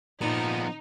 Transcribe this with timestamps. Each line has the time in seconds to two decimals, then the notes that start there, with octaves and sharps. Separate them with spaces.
0.21 A#2 F3 B3 D#4